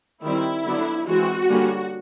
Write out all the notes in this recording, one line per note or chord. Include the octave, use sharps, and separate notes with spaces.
D#3 G3 C4 E4
D3 F#3 B3 D4
E3 G#3 C4 F#4
D3 G3 A#3 C#4